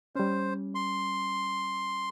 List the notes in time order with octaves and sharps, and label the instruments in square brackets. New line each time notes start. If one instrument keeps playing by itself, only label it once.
[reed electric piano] G3 C#4 [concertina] C5
[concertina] C6